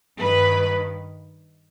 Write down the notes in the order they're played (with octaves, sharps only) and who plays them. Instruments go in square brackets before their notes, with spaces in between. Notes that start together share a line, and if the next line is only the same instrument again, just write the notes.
[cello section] G2 D#3 B4